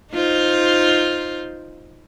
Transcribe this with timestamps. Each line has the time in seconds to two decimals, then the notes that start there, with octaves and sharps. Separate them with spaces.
0.12 D#4 F4 C5